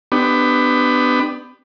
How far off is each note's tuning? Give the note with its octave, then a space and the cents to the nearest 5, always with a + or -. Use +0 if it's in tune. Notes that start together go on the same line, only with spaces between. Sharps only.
B3 +20 D4 +20 G4 +0